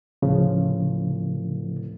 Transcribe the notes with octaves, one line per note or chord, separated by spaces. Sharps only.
D1 C#3 F3